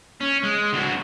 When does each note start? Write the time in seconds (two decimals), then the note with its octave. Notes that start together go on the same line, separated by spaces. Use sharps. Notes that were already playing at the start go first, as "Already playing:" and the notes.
0.21 C#4
0.43 G#3
0.73 D2 F#3